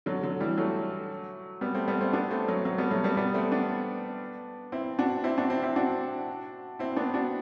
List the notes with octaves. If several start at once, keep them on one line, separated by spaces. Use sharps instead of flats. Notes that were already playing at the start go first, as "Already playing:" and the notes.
D3 F#3
D3 F#3
E3 G3
F#3 A3
G3 B3
A3 C4
G3 B3
A3 C4
B3 D4
A3 C4
F#3 A3
F#3 A3
G3 B3
F#3 A3
G3 B3
G3 B3
A3 C4
B3 D4
C4 E4
D4 F#4
C4 E4
D4 F#4
C4 E4
C4 E4
D4 F#4
C4 E4
B3 D4
D4 F#4